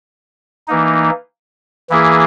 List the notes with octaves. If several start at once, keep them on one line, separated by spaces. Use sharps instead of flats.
E3 A#3 D#4
E3 A#3 E4 G#4